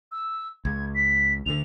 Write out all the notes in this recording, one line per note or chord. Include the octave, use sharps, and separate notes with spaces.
E6
C#2 G#6
B6
D2 D3 F7